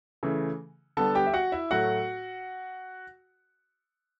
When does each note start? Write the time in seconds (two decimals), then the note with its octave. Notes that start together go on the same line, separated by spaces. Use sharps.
0.23 C#3 E3 A3
0.97 D3 G3 B3 A4 A5
1.15 G4 G5
1.26 E5
1.34 F#4 F#5
1.52 E4 E5
1.71 A2 F#3 A3 F#4 F#5